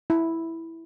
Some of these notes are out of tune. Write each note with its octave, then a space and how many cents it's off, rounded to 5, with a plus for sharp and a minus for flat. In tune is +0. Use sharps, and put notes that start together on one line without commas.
E4 -5